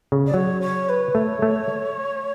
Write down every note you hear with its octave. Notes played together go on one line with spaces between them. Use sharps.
C#3
D5
F#3 C#5
C#5
B4
A3 C#5
A3